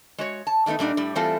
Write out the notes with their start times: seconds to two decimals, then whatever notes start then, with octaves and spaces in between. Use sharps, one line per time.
0.18 G#3 F#4 C#5
0.47 A5
0.66 D#3 G3 A3 B3 D#4
0.79 A#2 G3 D4 D#4
0.97 A2 G3
1.15 E3 G3 A3 C4 F4 A4